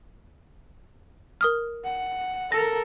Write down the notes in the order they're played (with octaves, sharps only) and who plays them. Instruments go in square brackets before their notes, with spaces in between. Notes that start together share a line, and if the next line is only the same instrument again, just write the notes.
[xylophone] A#4 D#6 F6
[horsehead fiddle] F#5
[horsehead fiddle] A4 A#4 [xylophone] A#6